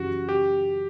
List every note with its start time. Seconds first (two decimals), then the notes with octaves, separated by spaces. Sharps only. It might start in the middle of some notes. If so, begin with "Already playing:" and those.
Already playing: F#2 C#3 E3 G3 F#4
0.29 G4